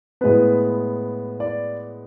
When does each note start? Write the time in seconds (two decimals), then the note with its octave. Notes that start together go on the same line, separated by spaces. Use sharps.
0.21 A2 G#3 B3 B4
1.40 D5